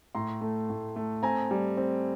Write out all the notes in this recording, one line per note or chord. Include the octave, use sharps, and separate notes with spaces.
A2 A#5 C6
A3
A2
A3
C4 G#5 A#5
G3
C4